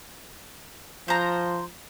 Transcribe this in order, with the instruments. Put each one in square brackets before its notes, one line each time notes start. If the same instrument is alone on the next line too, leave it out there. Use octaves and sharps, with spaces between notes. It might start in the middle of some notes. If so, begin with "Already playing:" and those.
[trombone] F3 [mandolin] C5 A#5